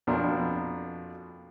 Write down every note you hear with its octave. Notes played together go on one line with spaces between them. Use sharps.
F2 B2 A#3 D4 A#5 C6